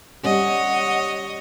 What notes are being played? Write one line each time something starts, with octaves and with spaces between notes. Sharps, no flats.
G3 C#4 C#5 D#5 F#5